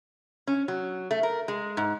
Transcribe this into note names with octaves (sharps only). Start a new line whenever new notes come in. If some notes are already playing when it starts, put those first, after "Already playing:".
C#4
F#3
A3
A#4
G#3
G#2